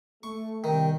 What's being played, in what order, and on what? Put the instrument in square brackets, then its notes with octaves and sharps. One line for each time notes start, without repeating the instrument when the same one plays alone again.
[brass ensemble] A3 [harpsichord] C#6
[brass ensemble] C2 G5 [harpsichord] D#3